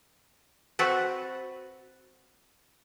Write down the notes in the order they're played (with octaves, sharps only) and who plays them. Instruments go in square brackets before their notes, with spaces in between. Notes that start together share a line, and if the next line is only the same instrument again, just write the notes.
[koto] C4 F#4 A4 B4